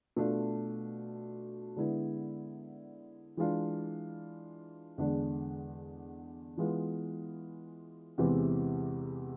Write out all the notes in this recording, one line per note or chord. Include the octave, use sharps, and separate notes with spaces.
B2 A3 D4 F4
D3 G#3 B3 E4
E3 G#3 D4 F4
E2 D3 G#3 D4
E3 G#3 B3 F4
E2 C3 E3 G#3 C4